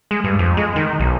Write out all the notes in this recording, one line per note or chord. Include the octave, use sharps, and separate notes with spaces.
G#3
G2
F2
G#3
D#3
B1